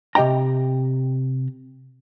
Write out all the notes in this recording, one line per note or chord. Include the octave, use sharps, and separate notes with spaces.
C3 G4 D#5 G5 A#5